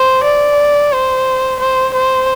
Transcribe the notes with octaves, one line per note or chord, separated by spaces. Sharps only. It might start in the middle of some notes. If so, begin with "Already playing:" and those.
Already playing: C5
D5
C5
C5
C5